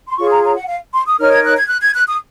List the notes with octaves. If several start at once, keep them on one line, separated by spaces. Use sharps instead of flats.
C6
F4 G#4 C#5 C#6
A#5
A#5
F#5
F5
C6
D#6
D#4 A#4 C#5 F6
G#6
F#6
G#6
F#6
G#6
F#6
D#6